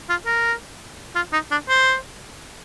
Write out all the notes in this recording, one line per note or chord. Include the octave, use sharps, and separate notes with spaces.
F4
A#4
F4
D#4
D4
C5